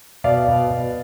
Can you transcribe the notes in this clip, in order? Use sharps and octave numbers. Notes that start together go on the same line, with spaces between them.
B2 D5 F5
B2
B2